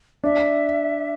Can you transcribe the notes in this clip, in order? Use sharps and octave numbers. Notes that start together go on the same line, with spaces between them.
D4 E5